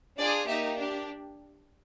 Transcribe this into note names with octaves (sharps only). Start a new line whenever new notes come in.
D4 F4 G#4 D5
A#3 D#4 G4 E5
D4 G4